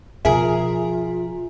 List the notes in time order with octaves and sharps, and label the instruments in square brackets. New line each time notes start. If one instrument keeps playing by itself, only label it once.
[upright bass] B2 F3 [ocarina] F4 [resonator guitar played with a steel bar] G#4 A#4 [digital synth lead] E5